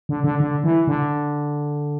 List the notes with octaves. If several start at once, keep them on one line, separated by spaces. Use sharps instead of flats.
D3
D3
D3
E3
D3